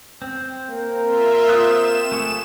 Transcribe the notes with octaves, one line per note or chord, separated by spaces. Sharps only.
C4
A#3 A#4 C5
F4 E5
C4 D#6 F#6 E7
A3 G#4 C#6